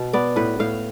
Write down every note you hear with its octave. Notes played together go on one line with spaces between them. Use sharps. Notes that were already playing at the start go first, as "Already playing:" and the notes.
Already playing: B2
B3 D5
A2 B4
A2 F5